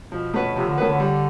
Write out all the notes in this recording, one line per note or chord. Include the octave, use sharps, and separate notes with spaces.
B2 F3
A3 C#4 F#4 B4
C3 F3
D3
D#3 A3 C#4 F#4 B4
D3
G3